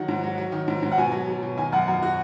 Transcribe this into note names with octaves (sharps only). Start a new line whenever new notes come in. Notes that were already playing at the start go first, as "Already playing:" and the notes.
Already playing: D#3 F#3 F#5
G#2
F#3
F#3
D#3
G#2
G#2
F#5
B2 G#5
F#3
F#3
B2
D#3 G#5
F#2 F#5
F#2
F#4